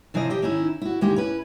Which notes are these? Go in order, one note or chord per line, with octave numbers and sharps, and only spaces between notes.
C3 E3 F3 C5 D#5
G4 D#5 E5
D#3 C#4 D#4 E4
E4 F#4
D2 D#3 G#3 A#3 E4 G4
C#4 E4 B4